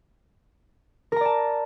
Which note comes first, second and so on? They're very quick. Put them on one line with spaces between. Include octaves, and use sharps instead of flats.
A#4 A#5 D5 A5